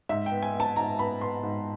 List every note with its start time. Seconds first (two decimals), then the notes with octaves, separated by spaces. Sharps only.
0.09 G#2 E5
0.26 G5
0.31 B3
0.42 G#5
0.54 B3
0.60 A5
0.76 G#2 A#5
0.99 B3 B5
1.21 B3 C6
1.43 G#2